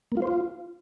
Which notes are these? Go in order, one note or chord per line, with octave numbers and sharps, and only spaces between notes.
A#3
F4
C5
F4